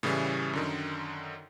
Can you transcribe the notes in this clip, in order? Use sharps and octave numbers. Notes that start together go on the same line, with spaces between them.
A2 C#3 E3 G3 A3
F#2 D3 D#3